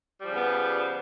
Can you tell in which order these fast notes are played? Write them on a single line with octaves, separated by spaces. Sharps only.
G3 F3 C#3 B3